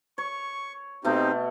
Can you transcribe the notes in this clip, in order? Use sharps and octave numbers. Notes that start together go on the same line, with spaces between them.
C#5 C#6
B2 A3 C4 D#4 G4